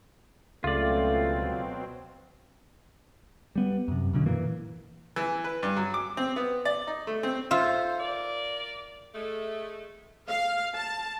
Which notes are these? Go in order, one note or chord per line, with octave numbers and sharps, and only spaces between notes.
C#2 B2 F#3 A3 C4 F4 D5
G3 B3
F#2 C3
F#2 B2 D3
A#2 E3 A#3
E3
B4
G2
F#3
D6
C4
B3
D5
D#4
A3
C4
D#4 F4 A4 C5 E5
A#4 D5
G#3 A3
F5
A5